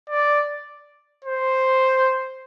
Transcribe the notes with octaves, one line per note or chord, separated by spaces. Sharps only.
D5
C5